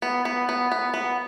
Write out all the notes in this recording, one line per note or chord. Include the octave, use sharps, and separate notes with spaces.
B3
B3
B3
B3
B3